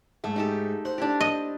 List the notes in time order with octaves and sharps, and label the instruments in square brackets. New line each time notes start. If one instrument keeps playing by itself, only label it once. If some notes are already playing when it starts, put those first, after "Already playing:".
[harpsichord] G#2 [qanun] A3
[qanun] D#4 G4 A4
[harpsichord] C5 [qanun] F#5
[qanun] D4 E4 G4
[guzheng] D#5